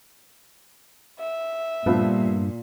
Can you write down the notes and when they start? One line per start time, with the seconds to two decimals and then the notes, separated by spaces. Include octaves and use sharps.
1.19 E5
1.86 G2 A#2 F3 A3 B3